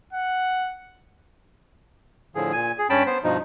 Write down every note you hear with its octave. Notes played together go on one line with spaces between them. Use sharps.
F#5
A2 D3 F3 G#4
A#2 G#5
G#4
G2 C#4 G5 A5 B5
B3 C5
G2 B2 F3 D#4